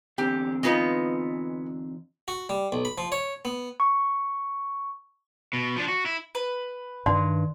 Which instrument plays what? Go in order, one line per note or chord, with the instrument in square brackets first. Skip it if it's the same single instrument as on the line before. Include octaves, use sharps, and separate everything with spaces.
[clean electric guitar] E2 D3 C4 [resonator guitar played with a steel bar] G4
[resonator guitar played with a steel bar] G#3 B3 B4 [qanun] D#4 F4 D#5
[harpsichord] F#4
G3
B1
B5
F3
C#5
B3
[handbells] C#6
[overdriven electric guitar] B2
F3 D4
F#4
E4
[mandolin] B4
[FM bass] G2 [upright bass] D#3 [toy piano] D5 C6